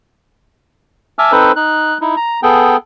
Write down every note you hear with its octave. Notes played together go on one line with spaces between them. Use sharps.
E5 G#5 A5 D6 E6 F6
C4 D#4 A4 B4 C5
D#4 F#6
D#4 E4
A#5
B3 G#4 A4 G5